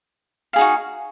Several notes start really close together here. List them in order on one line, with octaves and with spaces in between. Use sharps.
F5 G#4 D#4 F#4